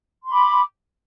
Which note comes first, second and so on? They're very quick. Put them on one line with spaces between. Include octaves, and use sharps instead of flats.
C6 B5 D6